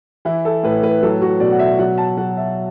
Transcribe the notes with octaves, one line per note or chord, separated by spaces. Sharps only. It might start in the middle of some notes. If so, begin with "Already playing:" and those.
E3 E4
A4
A2 B4
B4
F#3 A4
F#4
B2 D5
F#5
E5
F#3 F#5
A5
F#3 F#5
E5